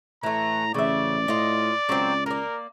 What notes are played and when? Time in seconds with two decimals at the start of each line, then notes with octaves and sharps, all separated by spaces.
0.23 A2 E3 A3 A#5
0.74 A1 C#3 D5 E5
1.28 A2 F4 D#5
1.89 C#2 F#3 A#3 C4
2.26 A#3 A#4 D5